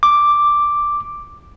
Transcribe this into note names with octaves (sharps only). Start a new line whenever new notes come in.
D6